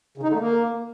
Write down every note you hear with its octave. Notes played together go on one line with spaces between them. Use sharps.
C#3
D#4
D3
A3
A#3